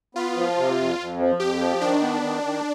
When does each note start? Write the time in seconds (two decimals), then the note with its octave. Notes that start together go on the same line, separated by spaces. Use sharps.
0.15 B3 F4
0.36 F3
0.57 C3
0.78 F2
0.99 F2
1.19 F3
1.40 F2 G4
1.60 F3
1.81 D#3 D4
2.02 B3
2.22 D#3
2.43 D#3